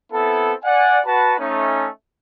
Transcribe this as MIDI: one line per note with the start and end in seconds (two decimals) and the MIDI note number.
0.12 0.54 59
0.12 0.54 60
0.12 0.54 64
0.12 0.54 69
0.64 1.00 74
0.64 1.00 78
0.64 1.00 80
1.06 1.35 66
1.06 1.35 71
1.06 1.35 81
1.39 1.88 57
1.39 1.88 61
1.39 1.88 63